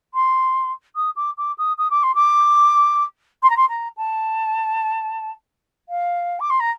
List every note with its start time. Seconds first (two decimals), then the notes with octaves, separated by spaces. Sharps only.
0.14 C6
0.95 D#6
1.16 D6
1.37 D6
1.58 D#6
1.78 D#6
1.90 D6
2.03 C6
2.15 D6
3.42 C6
3.50 A#5
3.57 C6
3.69 A#5
3.97 A5
5.89 F5
6.40 D6
6.50 C6
6.60 A#5